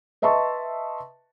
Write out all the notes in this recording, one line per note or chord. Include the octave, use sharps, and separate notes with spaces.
B4 D#5 E5 A5 C6 C#6